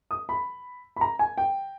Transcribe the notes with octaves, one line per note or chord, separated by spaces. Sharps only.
D#6
B5
B5
A#5
G#5
G5